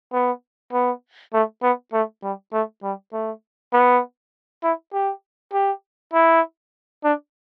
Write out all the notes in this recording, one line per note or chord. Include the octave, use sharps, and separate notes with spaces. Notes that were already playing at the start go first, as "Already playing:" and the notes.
B3
B3
A3
B3
A3
G3
A3
G3
A3
B3
E4
G4
G4
E4
D4